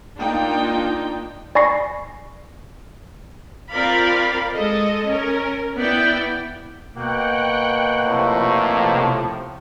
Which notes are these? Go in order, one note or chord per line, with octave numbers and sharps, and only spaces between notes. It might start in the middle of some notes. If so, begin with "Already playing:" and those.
A#3 D4 D#4 F4 G5
D5 G#5 B5 C#6 A#6 C7
C4 F4 A#4 D5 F5 B5
G#3 A4 D#5
C#4 A#4
B3 E4 D5 G5
B2 A#3 F#5 G5 F#6
A2 C3 F3